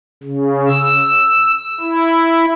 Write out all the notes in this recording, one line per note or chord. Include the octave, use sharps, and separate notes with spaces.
C#3
E6
E4